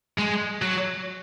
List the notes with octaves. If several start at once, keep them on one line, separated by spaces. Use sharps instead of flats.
G#3
F#3